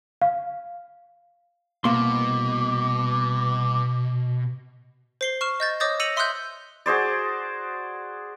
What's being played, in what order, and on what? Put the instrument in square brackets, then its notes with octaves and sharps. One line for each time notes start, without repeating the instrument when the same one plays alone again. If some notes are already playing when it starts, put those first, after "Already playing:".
[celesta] F5
[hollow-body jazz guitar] C2 A#3 C6 [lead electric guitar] B2 [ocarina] D6
[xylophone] C5 C7 G7
C#6 F6 E7
D#5 G6 A6
C#5 D#5 D6 D#6 G6 A6
E6 A#6 C#7 D#7 F7 F#7
E5 C6 D#6 E6 F#6 G6
[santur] F#4 G#4 C5 D5